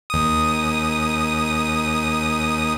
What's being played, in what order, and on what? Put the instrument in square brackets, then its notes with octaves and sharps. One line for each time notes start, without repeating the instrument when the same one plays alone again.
[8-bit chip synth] D#2 D#6